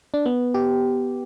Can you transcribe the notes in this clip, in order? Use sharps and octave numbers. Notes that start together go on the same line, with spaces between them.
D4
B3
G4